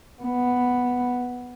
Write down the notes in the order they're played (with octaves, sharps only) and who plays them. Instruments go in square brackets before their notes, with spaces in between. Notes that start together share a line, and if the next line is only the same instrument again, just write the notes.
[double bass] B3